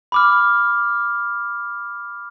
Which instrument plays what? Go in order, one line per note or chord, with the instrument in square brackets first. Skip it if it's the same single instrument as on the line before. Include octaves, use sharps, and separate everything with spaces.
[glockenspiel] B5 D6 F6